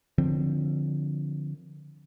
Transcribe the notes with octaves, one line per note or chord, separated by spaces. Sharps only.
D3 F3 C4